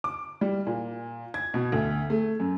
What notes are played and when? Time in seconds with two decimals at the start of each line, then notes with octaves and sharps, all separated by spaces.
0.04 D6
0.41 G3
0.67 A#2
1.34 G#6
1.54 B2
1.72 D2
2.10 A3
2.40 F#2